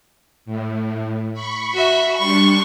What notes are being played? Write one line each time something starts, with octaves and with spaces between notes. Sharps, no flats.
A2
B5 C#6
F#4 E5
G3 D4 C6 C#6